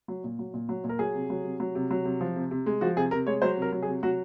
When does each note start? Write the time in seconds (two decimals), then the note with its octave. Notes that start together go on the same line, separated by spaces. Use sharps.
0.08 F#3
0.24 A#2
0.39 F#3
0.54 A#2
0.69 F#3
0.84 A#2
0.89 A#4
0.99 F#3 G#4
1.15 C3
1.30 F#3
1.44 C3
1.60 F#3
1.75 C3
1.91 F#3
2.05 C3
2.21 F3
2.36 C3
2.51 C3
2.66 G#3
2.81 F3 F#4
2.96 C3 G#4
3.11 C3 A#4
3.27 G#3 C#5
3.42 F#3 C5
3.57 C3 A#4
3.72 F#3
3.82 G#4
3.88 C3
4.03 F#3 F#4